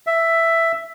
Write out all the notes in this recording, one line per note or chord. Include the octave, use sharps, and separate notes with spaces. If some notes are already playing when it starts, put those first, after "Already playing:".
E5